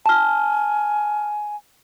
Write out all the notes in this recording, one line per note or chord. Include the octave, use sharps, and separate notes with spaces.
G#5 A5 F6